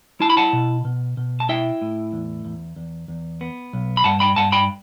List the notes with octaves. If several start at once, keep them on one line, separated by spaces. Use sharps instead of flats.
E4 A5
B5
F#5 A5
B2
B2
B2
A5
E4 E5 G5
A2
E2
E2
E2
E2
B3
B1
B5
G2 F#5 A5
G5 B5
G2 F#5 A5
G5 B5